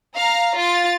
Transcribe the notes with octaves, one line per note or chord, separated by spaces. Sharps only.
F5 A#5
F4 A6